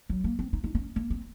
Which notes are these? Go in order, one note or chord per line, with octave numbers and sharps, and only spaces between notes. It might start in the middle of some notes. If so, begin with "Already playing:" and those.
F#3
A#3
C4
D#4
D#4
C#4
A#3
C4